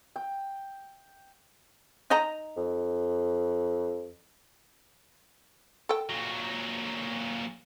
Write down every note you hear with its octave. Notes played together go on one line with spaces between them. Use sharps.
G5
D#4 D#5 A#5
F2
A4 G5
A#2 F#3